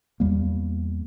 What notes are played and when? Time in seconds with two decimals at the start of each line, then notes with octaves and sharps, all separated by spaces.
0.20 E2 G3 A#3